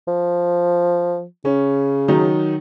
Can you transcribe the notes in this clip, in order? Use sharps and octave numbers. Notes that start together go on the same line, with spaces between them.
F3
C#3 C#4
D#3 F#3 D#4